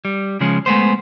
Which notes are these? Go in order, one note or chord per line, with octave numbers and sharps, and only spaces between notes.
G3
C#3 F3 G#3 C#4
G#3 A3 B3 C5